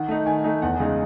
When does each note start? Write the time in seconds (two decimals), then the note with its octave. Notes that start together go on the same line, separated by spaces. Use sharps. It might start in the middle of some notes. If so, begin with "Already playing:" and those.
Already playing: D#3 F#5
0.09 A3 D#4
0.26 D#3 G#5
0.44 A3 D#4
0.62 E2 F#5
0.80 C#3 G#3 D#4